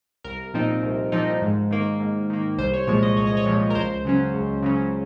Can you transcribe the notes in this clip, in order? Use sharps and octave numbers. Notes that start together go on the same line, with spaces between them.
C2 A#4
A#2 F3 C4 D#4
C2
A#2 F3 C4 D#4
G#2
D#3 A#3
G#2
D#3 A#3
C2 C5
C#5
A#2 F3 G#3 C#5
D#5
C2 C#5
D#5
C#5
A#2 F3 G#3
A#4
C#2 C5
C#3 F#3 C#4
C#2
C#3 F#3 C#4